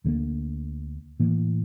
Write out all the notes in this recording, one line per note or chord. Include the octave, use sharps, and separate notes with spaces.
D2 D3 G3 A#3
A2 E3 A#3